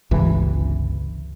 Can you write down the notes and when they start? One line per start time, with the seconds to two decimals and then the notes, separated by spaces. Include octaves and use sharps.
0.11 G1 C#2 C3 E3